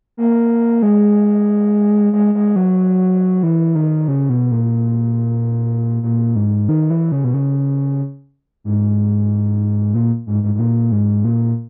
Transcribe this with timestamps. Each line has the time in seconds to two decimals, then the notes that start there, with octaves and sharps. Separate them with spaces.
0.17 A#3
0.82 G#3
2.13 G#3
2.35 G#3
2.56 F#3
3.43 E3
3.75 D#3
4.08 C#3
4.30 B2
4.52 A#2
6.03 A#2
6.36 G#2
6.69 D#3
6.90 E3
7.12 C#3
7.24 B2
7.34 C#3
8.64 G#2
9.94 A#2
10.27 G#2
10.43 G#2
10.55 G#2
10.59 A#2
10.92 G#2
11.24 A#2